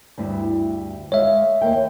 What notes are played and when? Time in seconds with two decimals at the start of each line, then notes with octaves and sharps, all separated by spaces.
0.18 D2 G2 E4
1.12 G#3 C#5 E5 F5
1.61 D#2 A#3 G5